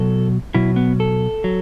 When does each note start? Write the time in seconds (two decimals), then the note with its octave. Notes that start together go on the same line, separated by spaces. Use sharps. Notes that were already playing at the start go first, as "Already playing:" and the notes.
Already playing: B2 F#3 A4
0.54 B2 F#3 E4
0.76 B3
1.00 A4
1.44 F#3